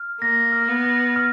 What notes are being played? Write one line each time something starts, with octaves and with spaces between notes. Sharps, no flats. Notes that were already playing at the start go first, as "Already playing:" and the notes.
Already playing: F6
A#3 A#6
F6
B3
A#6
F6